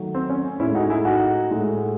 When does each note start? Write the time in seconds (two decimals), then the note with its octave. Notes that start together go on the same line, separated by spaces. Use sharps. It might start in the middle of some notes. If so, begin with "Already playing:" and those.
Already playing: D#3 F#3 A3
0.15 C4
0.30 C#4
0.60 G#3 C#4 E4
0.63 A2
0.75 D#4 F#4
0.90 E4 G#4
1.05 D#4 F#4
1.50 A2 G#3